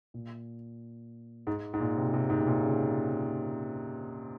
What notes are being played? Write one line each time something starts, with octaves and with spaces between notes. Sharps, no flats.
A#2
G#2
G#2
A#2
C3
C3
G#2
C3
A#2
C#3